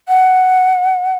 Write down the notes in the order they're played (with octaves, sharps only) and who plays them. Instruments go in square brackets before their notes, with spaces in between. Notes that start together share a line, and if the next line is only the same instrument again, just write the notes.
[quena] F#5